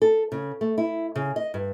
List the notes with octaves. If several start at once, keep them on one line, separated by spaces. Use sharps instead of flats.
A4
C#3
A3
E4
C#3
D#5
G2